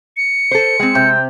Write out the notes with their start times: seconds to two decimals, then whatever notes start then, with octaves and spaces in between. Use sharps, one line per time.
0.17 C#7
0.51 A4 C5
0.80 G#3 C4
0.95 C3 G5